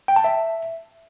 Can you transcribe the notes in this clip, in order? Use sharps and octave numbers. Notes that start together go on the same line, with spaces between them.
G5
A5
E5